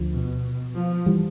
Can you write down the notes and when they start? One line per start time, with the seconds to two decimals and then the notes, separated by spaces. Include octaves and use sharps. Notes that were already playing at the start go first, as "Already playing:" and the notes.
Already playing: D2 D3 F3
0.13 B2
0.75 F3
1.06 E3 G3